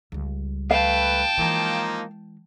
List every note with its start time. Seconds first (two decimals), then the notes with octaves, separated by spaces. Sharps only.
0.12 C#2 G3
0.71 A3 B4 F5 G5 A5
1.38 E3 F3 G#3 A#3 D#4